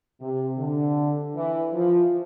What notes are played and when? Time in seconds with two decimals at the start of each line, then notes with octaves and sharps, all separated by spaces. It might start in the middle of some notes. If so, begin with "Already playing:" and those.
0.20 C3
0.58 D3
1.34 E3
1.73 F3